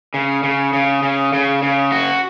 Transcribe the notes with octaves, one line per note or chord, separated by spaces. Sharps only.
C#3
C#3
C#3
C#3
C#3
C#3
F#4